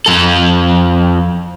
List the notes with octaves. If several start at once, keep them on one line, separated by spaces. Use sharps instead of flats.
F2 A4